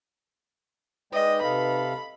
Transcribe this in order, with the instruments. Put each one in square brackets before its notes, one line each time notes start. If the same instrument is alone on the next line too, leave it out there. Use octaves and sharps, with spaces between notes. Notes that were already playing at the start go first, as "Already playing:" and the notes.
[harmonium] G#3 D5 G5 [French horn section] D#4 B4 [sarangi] D#5
[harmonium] C3 A4 F5 [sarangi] B5